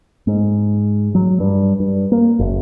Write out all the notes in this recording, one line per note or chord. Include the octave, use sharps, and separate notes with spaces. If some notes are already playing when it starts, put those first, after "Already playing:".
G#2
F#3
G2
G2
A#3
F#1